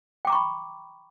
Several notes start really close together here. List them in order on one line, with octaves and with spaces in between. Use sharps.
G5 D6 A#5 C#6 B5